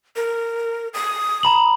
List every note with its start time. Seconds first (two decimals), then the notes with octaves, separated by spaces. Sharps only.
0.17 A#4
0.94 D#6
1.43 A#5 B5 F#7